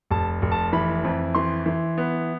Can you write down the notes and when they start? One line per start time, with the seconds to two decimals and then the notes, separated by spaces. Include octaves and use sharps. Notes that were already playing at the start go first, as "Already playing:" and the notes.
0.11 F1 A5
0.42 F1
0.52 A5
0.73 E3 B5
1.04 F2
1.35 E3 C6
1.66 E3
1.98 B3